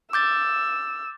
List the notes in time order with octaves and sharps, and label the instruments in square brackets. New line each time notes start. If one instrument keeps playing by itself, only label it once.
[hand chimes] D6 G6 A6 [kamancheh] E6